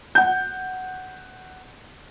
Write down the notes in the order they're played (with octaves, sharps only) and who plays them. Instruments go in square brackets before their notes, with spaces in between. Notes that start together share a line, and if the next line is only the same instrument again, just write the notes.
[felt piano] F#5 G6